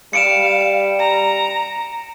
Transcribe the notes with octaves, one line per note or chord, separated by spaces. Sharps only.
G3 F5 C#7 D7 E7
A#5